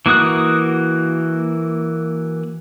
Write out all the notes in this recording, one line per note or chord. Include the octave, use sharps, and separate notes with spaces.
E3 A#3 F#4 D#6 F#6